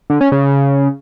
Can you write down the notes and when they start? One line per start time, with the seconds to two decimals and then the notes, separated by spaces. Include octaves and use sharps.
0.10 D3
0.21 C#4
0.32 C#3